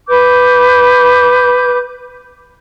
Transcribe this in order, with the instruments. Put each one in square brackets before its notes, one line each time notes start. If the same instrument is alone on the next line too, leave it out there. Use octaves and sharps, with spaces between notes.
[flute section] B4 D6 G6